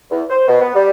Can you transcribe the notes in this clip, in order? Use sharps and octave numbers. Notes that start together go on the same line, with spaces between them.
E2
C5
B2
B3
G3